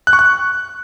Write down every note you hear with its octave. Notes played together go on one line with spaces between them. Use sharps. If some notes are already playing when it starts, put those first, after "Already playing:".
F#6
C#6
F#6